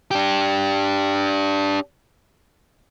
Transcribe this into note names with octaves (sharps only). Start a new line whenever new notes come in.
D4 G4